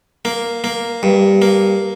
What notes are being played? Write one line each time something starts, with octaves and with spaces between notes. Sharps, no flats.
A#3
A#3
G2
A#3